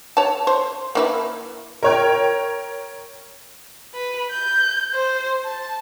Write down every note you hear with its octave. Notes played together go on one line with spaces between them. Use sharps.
C#5 A5
C5
A#3 E4 B4
A#4 C#5 G5
B4
G6
C5
A5